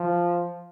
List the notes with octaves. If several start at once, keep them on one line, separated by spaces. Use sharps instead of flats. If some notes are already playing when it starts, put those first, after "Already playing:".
Already playing: F3